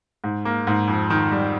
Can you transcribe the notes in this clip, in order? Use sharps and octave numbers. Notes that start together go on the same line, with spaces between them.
G#2
A#3
G#2
F2
D#3
G3